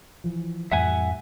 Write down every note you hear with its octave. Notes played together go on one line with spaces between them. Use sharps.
E3 F3
F2 A2 E3 G3 E5 F#5 G#5